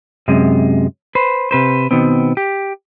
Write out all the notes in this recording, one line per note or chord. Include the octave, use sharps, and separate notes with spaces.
F#2 C3 G#3
B4 C5
C3 B4 C5
B2 D#3 B3 C4
G4